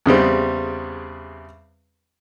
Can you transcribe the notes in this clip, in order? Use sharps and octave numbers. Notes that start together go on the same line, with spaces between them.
E2 C#3 G3 C4